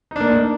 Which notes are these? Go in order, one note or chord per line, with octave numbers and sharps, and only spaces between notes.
A#3 D4 D#4